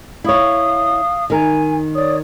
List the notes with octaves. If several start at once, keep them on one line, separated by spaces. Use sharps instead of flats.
E4 C#5 F5 D#6
D#3 A#4 G#5
C#5 D5 D#6